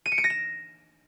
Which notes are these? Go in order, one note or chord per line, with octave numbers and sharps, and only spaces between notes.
D#7
C#7
D7
A#6
E7